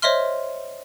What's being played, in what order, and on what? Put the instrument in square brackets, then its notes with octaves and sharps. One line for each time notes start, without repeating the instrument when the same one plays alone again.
[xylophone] C5 C#5 D#5 E5 C6 F6